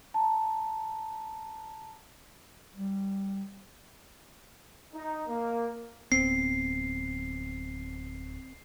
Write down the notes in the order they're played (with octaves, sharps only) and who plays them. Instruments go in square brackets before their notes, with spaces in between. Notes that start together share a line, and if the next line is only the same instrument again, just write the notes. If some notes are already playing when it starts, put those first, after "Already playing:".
[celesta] A5 A#5
[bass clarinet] G3
[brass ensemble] D#4
A#3
[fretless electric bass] D1 B3 [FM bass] C4 [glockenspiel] C7